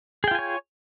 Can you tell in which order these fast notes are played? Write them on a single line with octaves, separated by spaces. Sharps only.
G#4 G5 F4 G#5 C#5